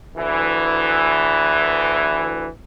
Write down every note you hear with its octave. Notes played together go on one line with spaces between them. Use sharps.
D2 E3